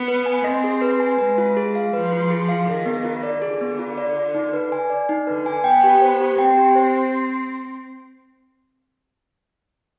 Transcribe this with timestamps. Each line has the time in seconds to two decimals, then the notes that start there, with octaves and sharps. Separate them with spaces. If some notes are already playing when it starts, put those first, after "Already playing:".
Already playing: B3
0.08 B4
0.26 G#5
0.44 C4 D#5
0.64 G#4
0.82 B4
1.00 G#5
1.18 G#3 B4
1.38 F4
1.57 G#4
1.75 F5
1.93 F3 B4
2.12 F4
2.30 G#4
2.49 F5
2.67 D#3 G#4
2.86 B3
3.05 F4
3.23 D5
3.42 D3 G#4
3.61 B3
3.79 F4
3.98 D5
4.15 D5
4.35 D#4
4.53 B4
4.72 G#5
4.90 D5
5.09 D#4
5.27 D3 B4
5.46 G#5
5.64 B3 G5
5.84 G4
6.02 C5
6.20 G4
6.39 C4 G5
6.57 G4
6.75 C5